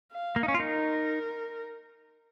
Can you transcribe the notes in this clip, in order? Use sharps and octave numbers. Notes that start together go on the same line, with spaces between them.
F5
A#3
D#4
C#4
F4
D#4 A#4